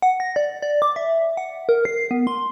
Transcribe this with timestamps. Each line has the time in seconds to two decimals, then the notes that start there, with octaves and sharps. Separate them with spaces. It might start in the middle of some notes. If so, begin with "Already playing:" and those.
0.02 F#5
0.20 A#6
0.36 D5
0.62 D5
0.82 D6
0.96 E5
1.37 F#5
1.69 A#4
1.85 C7
2.11 B3
2.27 C6